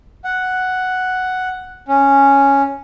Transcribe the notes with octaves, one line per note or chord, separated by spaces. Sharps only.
F#5
C#4